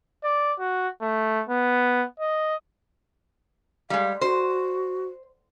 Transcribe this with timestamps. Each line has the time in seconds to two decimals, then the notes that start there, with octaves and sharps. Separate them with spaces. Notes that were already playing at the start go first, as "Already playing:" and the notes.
0.24 D5
0.59 F#4
1.02 A3
1.49 B3
2.20 D#5
3.90 G3 G#3 F5
4.21 F#4 C5